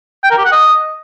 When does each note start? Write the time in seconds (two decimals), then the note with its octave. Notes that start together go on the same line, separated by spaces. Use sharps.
0.24 G5
0.31 A#4
0.38 G4
0.45 F#5
0.52 D#5